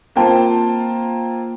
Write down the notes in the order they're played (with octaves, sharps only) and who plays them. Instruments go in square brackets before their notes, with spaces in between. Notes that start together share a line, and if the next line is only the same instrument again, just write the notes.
[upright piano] A#3 C4 F4 C5 G5 A5